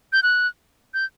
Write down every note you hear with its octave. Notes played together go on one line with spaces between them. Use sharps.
G6
F#6
G6